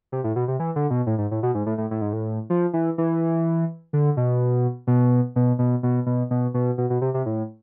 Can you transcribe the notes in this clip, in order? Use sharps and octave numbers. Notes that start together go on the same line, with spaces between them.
C3
A2
B2
C3
E3
D3
B2
A2
G#2
A2
B2
G#2
A2
A2
A2
G#2
A2
F3
E3
E3
D3
B2
B2
B2
B2
B2
B2
B2
B2
B2
B2
C3
C3
A2